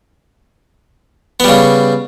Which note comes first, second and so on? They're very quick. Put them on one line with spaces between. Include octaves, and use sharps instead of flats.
B3 G3 C#3